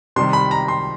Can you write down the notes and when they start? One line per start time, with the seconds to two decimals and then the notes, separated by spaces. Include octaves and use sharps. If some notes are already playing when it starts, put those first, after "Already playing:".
0.16 C3 D#3 G3 C6
0.33 B5
0.51 A#5
0.68 C6